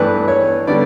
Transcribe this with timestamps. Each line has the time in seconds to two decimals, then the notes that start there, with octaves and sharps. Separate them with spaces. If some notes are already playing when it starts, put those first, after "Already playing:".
Already playing: G2 E3 A3 D4 B4
0.28 C#5
0.67 D3 G3 B3 D5